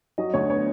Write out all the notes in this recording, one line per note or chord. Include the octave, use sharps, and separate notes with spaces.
F#3 D#5
D2 C#5
B3 C#5